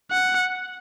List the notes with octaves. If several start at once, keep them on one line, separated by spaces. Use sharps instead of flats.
F#5